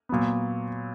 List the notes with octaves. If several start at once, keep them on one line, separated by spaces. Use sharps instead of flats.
A#2 F#3 B3